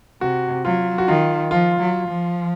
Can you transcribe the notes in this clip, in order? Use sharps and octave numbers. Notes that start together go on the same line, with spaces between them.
C3 F#4
F#3 F4
F#4
D#3 F4
F3 F4
F#3
F3